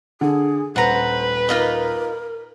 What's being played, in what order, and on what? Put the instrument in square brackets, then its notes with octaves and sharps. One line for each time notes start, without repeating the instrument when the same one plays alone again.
[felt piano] D3 [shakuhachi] G#4
[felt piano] D#1 [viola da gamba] B4 [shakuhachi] C5 [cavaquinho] F#5 A#5
[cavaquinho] D#4 F4 D#5 [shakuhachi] A#4